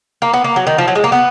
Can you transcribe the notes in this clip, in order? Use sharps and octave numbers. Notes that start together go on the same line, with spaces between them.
A#3
B3
A#3
F#3
D#3
F3
F#3
G#3
A#3
B3